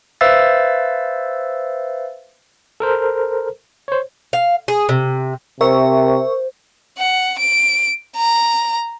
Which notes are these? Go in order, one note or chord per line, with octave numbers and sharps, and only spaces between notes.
B4 C5 E5 F5 E6 A6
A4 A#4 C5
C5 C#5
F5
G#4
C3
C3 A#4 C5 E5 C#6
F#5
D7
A#5